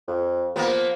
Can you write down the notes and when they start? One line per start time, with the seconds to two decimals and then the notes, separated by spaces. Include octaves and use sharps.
0.07 F2
0.56 F3 A#3 B3